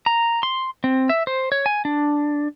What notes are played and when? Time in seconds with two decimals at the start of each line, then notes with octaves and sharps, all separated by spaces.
0.06 A#5
0.43 C6
0.84 C4
1.09 E5
1.27 C5
1.52 C#5
1.66 G#5
1.85 D4